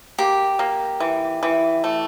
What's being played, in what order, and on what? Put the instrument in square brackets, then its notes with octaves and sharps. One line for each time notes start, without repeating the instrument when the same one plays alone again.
[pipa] A#3 [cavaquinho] G4
[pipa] A#3
E3
E3
A3